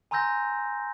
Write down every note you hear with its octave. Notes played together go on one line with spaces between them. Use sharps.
G#5 A#5 C6 E6 G6 A#6